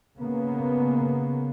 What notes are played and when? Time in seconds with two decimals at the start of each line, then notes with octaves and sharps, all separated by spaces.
0.18 C#3 A#3 B3